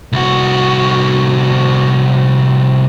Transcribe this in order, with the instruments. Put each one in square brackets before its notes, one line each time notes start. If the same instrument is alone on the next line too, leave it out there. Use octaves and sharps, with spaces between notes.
[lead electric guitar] C2 F#4